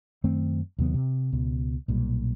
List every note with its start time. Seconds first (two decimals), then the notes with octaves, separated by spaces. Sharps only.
0.24 F#2 D#3 A3 C4
0.79 D#2 C3 F#3 B3
0.94 C3
1.32 C#2 B2
1.88 B1 A#2 G3